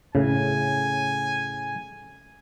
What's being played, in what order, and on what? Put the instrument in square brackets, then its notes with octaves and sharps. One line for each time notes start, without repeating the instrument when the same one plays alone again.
[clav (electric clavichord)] A2 C#3 [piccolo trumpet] G#5